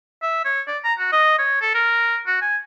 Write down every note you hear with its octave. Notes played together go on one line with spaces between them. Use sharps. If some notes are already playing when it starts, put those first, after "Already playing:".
E5
C#5
D5
A#5
F#4
D#5
C#5
A4
A#4
F#4
G#5